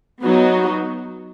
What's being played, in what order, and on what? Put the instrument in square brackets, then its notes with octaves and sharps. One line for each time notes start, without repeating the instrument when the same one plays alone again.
[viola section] F#3 B3 D#4 F#4